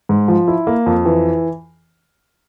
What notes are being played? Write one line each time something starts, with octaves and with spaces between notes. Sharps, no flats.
G#2
F3
E4
A#3
F2
E3